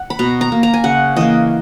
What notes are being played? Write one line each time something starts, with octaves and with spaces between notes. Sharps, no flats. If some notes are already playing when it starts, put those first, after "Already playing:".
Already playing: F#5
B5
B2 A#5
A#5
A#3
A#5
G#5
C#3 F#5
E3 A#3 D#5